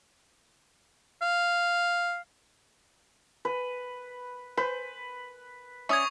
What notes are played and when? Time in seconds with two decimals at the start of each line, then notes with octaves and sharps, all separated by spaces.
1.22 F5
3.45 B4
4.57 B4 C5
5.89 C#4 D5 E5 C#6 D#6 G#6